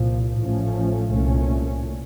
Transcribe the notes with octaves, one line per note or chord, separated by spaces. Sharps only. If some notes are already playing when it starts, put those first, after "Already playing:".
Already playing: C2 A#2 F3
A1 A2 F3 A3 C#4
C2 A#2 A3 C#4